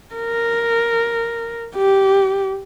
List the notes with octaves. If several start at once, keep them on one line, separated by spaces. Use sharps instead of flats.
A#4
G4